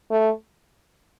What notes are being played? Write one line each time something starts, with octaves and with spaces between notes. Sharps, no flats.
A3